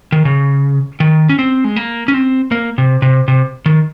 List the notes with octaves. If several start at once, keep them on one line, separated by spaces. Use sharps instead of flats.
D#3
C#3
D#3
C#4
C4
G#3
A#3
C#4
C4
A#3
C3
C3
C3
D#3